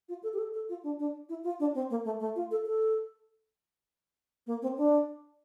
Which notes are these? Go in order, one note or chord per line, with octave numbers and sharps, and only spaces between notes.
F4
A4
G4
A4
A4
F4
D4
D4
E4
F4
D4
C4
A#3
A3
A3
F4
A4
A4
A#3
C4
D4